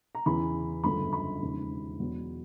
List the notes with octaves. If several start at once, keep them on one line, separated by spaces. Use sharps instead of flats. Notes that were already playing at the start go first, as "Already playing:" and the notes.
A#5
E2 C#3 E3 B5
G1 F#2 C#3 F3 A3 B5
B5
E1 D#2 C#3 F3
E2 B2 F#3 B3 D4